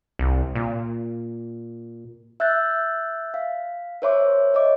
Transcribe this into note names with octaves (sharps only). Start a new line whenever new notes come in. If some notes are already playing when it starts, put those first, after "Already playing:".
C2
A#2
E5 E6 F#6 G6 A6
F5
A#4 C5 C#5 E5 C6 D6
C#5 D#5 D6